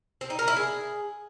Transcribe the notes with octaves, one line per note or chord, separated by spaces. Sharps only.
C4
D#4
A#4
E4
G#4